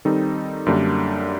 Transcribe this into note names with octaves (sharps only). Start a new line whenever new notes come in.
D#3 G3 C4 D#4 A4
F#2 D3 G3 A#3 D4